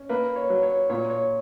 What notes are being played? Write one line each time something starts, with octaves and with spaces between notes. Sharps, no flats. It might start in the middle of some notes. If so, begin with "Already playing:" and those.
Already playing: C#4
A#3 B4
C#5
F#3
C#5
A#2 C#5
C#5